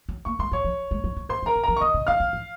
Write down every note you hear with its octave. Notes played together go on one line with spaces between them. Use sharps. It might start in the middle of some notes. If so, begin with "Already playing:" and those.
F#3
A#3 C#6
G#3 C6
F#3 C#5 C#6
F3
G#3
F#3
F3
F#3 C5 C6
F3
A#4 A#5
D#3
F3 A#4 A#5
C#6
D#3 D#5 D#6
C#3
D#3 F5 F6
F3
F3